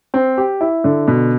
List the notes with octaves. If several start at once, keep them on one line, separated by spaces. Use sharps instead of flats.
C4
G4
E4
D3
B2